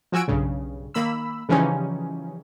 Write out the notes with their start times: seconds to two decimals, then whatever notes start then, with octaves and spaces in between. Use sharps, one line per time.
0.12 F3 F#4 G#5 E6 D7
0.28 B1 G2 C#3
0.94 D#3 A#3 B5 E6
1.49 C#3 E3 F3 G3 C#4 D#4